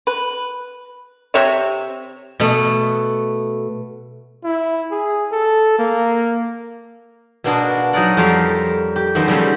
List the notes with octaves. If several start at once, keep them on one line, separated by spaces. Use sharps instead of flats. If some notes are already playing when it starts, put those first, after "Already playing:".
B4
C3 C#5 E5
B2 A3
E4
G#4
A4
A#3
B2 A#3 B3 D4 F#4 G#4
F#3 D#4 G#4 A#4 D5 F#5
F2 G3 A4 A#4 C#5 F5
G4
F#2 D#3 F3 B3
C#3 G3 A3 C4 C#4 A5